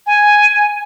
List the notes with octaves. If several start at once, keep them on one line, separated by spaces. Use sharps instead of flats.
G#5